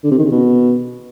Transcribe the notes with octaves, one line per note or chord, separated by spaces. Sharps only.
D3
C3
D#3
C#3
B2